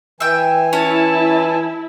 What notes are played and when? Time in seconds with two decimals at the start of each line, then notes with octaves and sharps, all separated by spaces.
0.20 E3 E5 G5 G#5
0.73 C#4 E4 C#5 A5